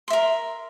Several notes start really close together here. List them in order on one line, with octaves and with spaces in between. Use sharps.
C6 E5 A#4